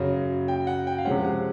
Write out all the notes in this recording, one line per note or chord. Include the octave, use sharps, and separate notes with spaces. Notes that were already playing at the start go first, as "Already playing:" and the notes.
Already playing: F#2 C#3 F#3
G5
F#5
G5
F5
C3 F3 G#3 C#4 F#5
F#5